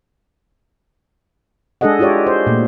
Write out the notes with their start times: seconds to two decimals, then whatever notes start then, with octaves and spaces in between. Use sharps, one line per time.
1.81 G#3 D4 G#4 A4 D#5 F#5
1.99 E4 F4 G4 C#5 D5
2.27 C5
2.47 A#2 A3